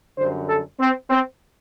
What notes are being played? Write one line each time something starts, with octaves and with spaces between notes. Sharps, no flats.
F#2 D3 G3 C5
A4
C4
C4